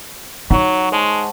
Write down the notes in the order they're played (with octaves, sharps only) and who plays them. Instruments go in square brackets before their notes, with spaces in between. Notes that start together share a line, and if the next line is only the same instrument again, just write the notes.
[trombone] F#3 [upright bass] D#4 [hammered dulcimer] C#5 F#5
[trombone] G#3 [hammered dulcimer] C5 A5